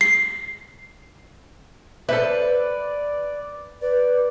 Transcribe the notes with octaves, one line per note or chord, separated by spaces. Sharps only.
C7
A4 B4 C5 D5 E5
B4 D5